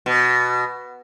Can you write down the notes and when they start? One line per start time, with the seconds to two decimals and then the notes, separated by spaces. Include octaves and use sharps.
0.06 B2